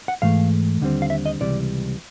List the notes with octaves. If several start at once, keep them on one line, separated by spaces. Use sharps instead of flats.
F#5
G#2 E3 A3 F5
D#2 D3 G3 C4
F5
E5
D#5
C#2 C3 E3 G3 D5